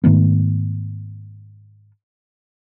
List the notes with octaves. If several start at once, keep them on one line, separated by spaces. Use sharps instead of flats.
G#2 D#3 A3 B3